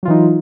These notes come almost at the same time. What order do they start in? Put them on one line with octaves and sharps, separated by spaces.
F#3 F4 E3 D#4